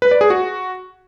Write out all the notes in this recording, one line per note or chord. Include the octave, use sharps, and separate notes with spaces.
B4
D5
G#4
F#4